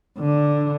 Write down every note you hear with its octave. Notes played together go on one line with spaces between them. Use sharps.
D3